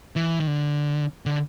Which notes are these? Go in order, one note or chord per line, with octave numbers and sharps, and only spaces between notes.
E3
D#3
D3
D3